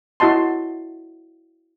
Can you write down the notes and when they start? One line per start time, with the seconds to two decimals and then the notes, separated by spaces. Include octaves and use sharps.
0.20 E4 F#4 D#5 A5 C6